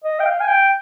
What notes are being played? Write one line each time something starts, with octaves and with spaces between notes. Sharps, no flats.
D#5
G5
F5
G#5
G5